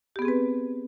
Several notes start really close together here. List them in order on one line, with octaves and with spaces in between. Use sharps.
G4 B3 G#4 C4 B4